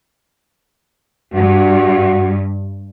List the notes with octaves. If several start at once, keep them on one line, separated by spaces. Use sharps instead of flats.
G2 F#4